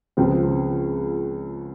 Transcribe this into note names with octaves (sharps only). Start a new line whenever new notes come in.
C#2 C#3 F3 C4